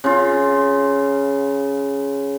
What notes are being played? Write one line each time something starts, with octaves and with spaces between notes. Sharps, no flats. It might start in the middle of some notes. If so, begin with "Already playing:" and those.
C#3 F4